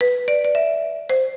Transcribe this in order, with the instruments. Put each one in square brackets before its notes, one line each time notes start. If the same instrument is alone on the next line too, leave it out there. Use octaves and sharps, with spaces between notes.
[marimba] B4
D5
D5
E5
C5